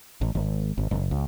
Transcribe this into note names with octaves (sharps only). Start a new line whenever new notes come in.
A1
G#1
G#1
F#1
C#2